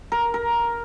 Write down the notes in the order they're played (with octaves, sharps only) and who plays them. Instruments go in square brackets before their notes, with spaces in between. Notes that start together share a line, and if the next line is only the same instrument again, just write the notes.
[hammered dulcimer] A#4
A#4